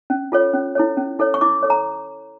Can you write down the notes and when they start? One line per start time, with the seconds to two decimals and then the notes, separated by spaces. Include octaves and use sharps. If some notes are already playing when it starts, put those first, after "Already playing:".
0.10 C#4
0.32 F4 A4 C#5
0.53 C#4
0.75 E4 A4 C#5
0.97 C#4
1.19 E4 A4 C#5
1.34 C#6
1.41 E4 D6
1.63 A4 C#5
1.70 A#5